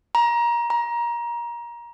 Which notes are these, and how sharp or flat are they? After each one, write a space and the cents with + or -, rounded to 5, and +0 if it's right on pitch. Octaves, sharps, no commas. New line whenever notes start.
A#5 +25
A#5 +25